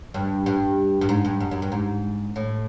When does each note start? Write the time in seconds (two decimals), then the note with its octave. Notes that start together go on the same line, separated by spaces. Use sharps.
0.14 G2
0.46 G2
1.01 G2
1.09 G#2
1.25 G2
1.40 F#2
1.51 F#2
1.62 G2
1.72 G#2
2.36 A2